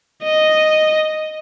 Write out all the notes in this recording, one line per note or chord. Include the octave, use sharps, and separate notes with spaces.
D#5